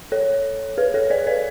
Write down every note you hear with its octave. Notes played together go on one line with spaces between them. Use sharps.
A4 C#5
G#4 B4
A4 C#5
B4 D5
B4 D5